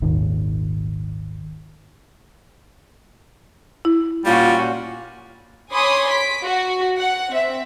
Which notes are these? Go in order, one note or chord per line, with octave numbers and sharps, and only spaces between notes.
D#1 G#1 D#2 D#3
E4
A#2 G3 C#4 F4 F#4
C#5 G#5 B5 C6 D6 D#6
B6 D7
F#4
F#5
C4 E5